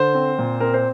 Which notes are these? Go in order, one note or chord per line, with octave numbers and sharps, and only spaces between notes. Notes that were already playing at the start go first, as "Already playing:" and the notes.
Already playing: D3 C5
C4
A#2
C4 A#4
C5